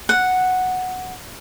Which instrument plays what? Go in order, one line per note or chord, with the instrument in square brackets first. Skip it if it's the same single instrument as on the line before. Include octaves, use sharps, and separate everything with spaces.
[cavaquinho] F#5